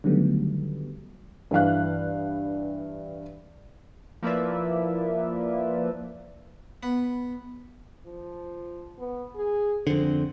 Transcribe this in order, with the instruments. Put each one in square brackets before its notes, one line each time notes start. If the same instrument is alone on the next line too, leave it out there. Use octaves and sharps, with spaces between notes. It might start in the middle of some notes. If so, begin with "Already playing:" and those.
[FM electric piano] D3 D#3 F#3 G3 A3 B3
[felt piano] G2 E3 F5 F#6
[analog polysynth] F3 A#3 E4 B4 D5 E5
[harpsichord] B3
[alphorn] F3
B3
G#4
[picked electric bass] F2 D3 [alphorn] C4